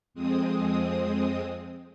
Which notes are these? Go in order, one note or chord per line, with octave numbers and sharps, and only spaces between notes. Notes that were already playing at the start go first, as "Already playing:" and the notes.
F2 G#3 C4 D#6